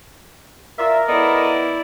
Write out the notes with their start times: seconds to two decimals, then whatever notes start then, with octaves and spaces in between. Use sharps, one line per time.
0.79 F4 A#4 D5 E5
1.08 B3 E4 A4 D5 D#5